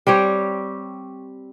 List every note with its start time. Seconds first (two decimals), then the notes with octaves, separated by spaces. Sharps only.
0.07 G3 C4 G4 C#5